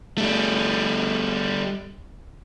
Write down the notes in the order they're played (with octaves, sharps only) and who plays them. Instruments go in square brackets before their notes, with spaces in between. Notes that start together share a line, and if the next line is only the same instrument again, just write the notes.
[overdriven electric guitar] G3 A3